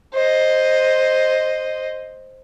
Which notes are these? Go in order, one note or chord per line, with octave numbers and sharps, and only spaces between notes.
C5 D#5